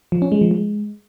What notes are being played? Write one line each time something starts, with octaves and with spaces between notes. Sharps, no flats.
F3
C#4
G#3
F3
G#3